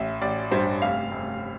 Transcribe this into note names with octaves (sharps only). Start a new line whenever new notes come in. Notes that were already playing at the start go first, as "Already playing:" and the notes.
Already playing: A1 E5
A1 D5
G2 C5
F1 F5
F1